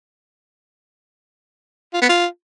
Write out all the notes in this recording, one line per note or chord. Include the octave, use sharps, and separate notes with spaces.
F4
B3
F4